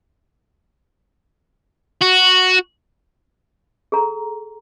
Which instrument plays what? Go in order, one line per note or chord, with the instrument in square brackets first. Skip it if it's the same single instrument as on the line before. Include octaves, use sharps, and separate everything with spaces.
[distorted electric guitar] F#4
[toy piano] G#4 A4 A#5